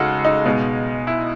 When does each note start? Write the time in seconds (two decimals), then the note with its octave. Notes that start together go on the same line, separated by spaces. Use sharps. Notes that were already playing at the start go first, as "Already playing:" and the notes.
Already playing: C#3 G#3 D#4 F#4 A4
0.25 D#4
0.45 B2 G#3
1.07 E4